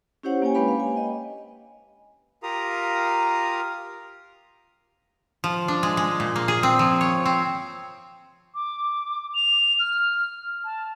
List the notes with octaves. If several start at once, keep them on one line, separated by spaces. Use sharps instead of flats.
C#4 E4 G4 C5 C#5 F#5
A#3 C#4 G4 C#5 G5 G#5
G#3 A#3 D4 B4 F5 B5
F5
G#5
D#5 G5
F4 G4 A#4 F5 A#5 D#6
F3
D4
G#3
G#3
A#2
A#3
G#4
C4
F3
C#5
C4
D6
F7
F6
A5